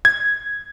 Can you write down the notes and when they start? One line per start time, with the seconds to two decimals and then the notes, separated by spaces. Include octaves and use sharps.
0.05 G#6